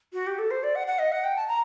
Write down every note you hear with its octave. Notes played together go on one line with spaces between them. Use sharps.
F#4
G4
A4
C5
D5
F#5
F#5
D#5
F#5
G5
A5
A#5